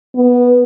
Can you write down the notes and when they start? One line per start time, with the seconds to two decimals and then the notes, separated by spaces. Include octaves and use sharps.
0.16 B3